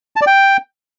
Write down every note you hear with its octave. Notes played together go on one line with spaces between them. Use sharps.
A5
D5
G5